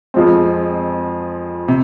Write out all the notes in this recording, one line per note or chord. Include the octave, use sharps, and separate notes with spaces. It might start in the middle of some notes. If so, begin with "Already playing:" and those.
F2 F3 G#3 C4
C3